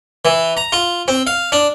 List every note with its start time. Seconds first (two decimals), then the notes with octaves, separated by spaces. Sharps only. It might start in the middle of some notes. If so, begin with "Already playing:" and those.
0.25 E3
0.57 A#5
0.72 F4
1.08 C4
1.27 F5
1.52 D4